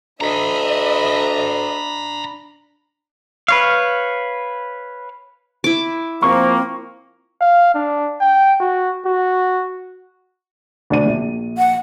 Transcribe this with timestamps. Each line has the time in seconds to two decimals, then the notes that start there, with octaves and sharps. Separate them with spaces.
0.21 D2 D4 D#5 E5 A#5 B5
3.48 B4 C#5 F5
5.64 E4 D6
6.22 F3 A#3 C4 C#6
7.41 F5
7.75 D4
8.21 G5
8.61 F#4
9.06 F#4
10.90 D2 D4 D#7
11.06 A#1
11.58 F#5